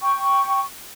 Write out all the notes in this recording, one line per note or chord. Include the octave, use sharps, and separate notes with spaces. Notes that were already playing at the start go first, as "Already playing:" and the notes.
G5 C#6